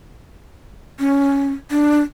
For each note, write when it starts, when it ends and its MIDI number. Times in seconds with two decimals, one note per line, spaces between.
1.00 1.51 61
1.71 2.00 62